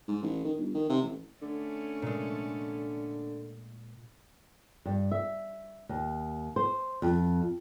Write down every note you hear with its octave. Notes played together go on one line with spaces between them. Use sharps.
G#2
A1
D#3
G1
D#3
C3
A1
D3 A3 C#4
A#2 G#3
G2
E5
D#2
C5
F2